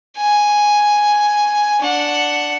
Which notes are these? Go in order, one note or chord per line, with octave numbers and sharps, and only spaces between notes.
G#5
D4 F#5